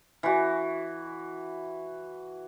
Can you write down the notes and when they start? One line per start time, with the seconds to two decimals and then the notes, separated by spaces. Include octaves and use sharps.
0.23 E3 F#4